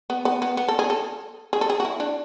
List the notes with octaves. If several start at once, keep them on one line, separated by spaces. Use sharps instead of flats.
B3
B3
B3
B3
A4
G#4
A4
G#4
A4
G#4
F#4
E4
D4